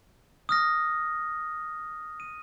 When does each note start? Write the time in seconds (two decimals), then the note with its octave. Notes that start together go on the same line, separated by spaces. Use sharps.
0.49 D#6 F6 A#6
2.20 D#7